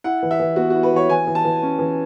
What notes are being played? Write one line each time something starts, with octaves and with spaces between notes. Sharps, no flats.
E4 F#5
E3
E5
E3
B3 F#4
E4 F#4
B4
E3 C#5
E3 G#5
E3
A5
E3
C#4
E3